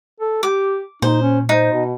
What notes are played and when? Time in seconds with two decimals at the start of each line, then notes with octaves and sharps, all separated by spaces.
0.20 A4
0.43 G4 D6
1.02 A#2 D#4 C5
1.22 C#4
1.49 D#4 C5
1.72 B2